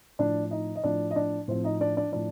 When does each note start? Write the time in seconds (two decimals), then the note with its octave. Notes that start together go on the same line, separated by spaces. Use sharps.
0.19 A2 F3 D4 D5
0.51 D#4 D#5
0.76 D#5
0.84 A2 F3 D4 D5
1.11 D#5
1.16 D4 D5
1.48 A2 F3 C4 C5
1.64 D#4 D#5
1.80 D4 D5
1.97 D4 D5
2.12 A2 F3 D4 D5